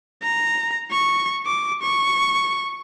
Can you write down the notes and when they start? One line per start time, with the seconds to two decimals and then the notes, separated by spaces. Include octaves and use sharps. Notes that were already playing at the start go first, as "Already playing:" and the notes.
0.23 A#5
0.91 C#6
1.46 D6
1.82 C#6